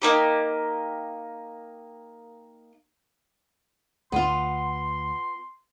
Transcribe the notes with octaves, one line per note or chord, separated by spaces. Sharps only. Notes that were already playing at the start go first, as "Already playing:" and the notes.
A#3 D#4 G4
D2 B3 F4 C6